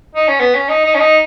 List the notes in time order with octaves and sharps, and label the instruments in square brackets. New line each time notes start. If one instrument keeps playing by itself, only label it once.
[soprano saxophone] D#4
C#4
B3
C#4
D#4
D#4
C#4
D#4